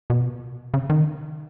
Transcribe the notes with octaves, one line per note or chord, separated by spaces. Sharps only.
B2
C#3
D#3